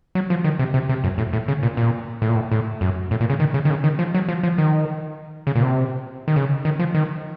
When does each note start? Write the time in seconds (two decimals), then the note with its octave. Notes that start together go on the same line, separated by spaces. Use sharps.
0.15 F#3
0.30 F3
0.44 D#3
0.59 C3
0.74 C3
0.89 C3
1.04 F#2
1.18 A2
1.33 A2
1.48 C#3
1.63 A#2
1.77 A#2
2.22 A2
2.29 A#2
2.35 A2
2.51 A2
2.81 F#2
3.11 A2
3.21 A#2
3.30 C#3
3.40 D#3
3.54 C#3
3.65 D#3
3.70 C#3
3.84 D#3
3.99 F3
4.15 F#3
4.29 F3
4.43 F3
4.58 D#3
5.47 C#3
5.55 A#2
5.62 C3
6.28 D#3
6.36 C#3
6.65 D#3
6.79 F3
6.94 D#3